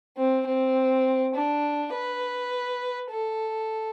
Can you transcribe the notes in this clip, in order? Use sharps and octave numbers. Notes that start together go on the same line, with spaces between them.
C4
C4
D4
B4
A4